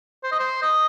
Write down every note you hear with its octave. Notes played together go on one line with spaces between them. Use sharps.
C5
D#5
C5
D#5